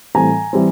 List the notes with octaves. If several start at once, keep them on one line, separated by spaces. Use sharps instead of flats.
A2 E3 G3 C4 G#5 A#5
E3 G3 C4